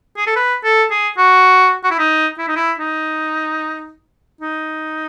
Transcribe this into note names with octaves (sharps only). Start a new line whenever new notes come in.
G#4
A4
B4
A4
G#4
F#4
F#4
E4
D#4
E4
D#4
E4
D#4
D#4